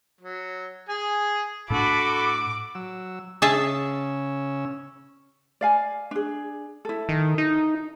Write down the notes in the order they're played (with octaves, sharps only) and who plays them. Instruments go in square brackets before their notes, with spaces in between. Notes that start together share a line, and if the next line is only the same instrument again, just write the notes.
[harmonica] F#3
G#4 G#5
[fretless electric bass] A2 C#4 D4 [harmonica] F#4 [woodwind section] A4 B5 [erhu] D6
[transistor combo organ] F#3 E6
[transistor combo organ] C#3 C#4 E6 [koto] G#4 E5 A5
[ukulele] D5 F5 G#5
D4 G#4
E4 A4
[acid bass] D#3
D#4